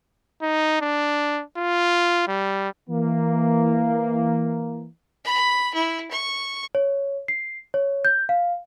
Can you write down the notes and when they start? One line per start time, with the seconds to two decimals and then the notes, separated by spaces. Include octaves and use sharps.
0.42 D#4
0.81 D4
1.57 F4
2.28 G3
2.89 E3 A#3
5.24 B5
5.74 E4
6.11 C#6
6.75 C#5
7.28 C7
7.74 C#5
8.05 G6
8.29 F5